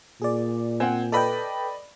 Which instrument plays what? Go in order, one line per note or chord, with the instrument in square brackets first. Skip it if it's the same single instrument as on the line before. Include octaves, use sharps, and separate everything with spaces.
[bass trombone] A#2 [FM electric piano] G#4 D5
[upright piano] C4 F#5 [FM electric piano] G#5
[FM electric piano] A4 B4 G5 [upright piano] D5 D#5 B5